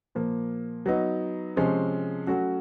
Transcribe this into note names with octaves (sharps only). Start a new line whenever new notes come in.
A#2 F3 A#3
F#3 B3 D#4
C3 F3 G#3 C#4
F#3 A3 C#4 F#4